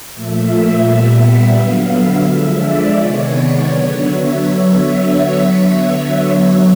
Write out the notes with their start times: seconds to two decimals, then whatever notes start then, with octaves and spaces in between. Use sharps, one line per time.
0.14 A#2 F3 A3 E5
0.84 A#2 G3 B3 E5
1.54 D3 F#3 B3 F5
1.90 E5
2.25 D3 F3 G#3
2.60 D5
2.96 C3 D#3 G#3 B3 C#5
3.31 D5
3.66 D3 F#3 B3 C#5
4.02 E5